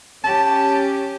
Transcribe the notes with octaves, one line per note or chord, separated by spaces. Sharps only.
C#4 G4 A5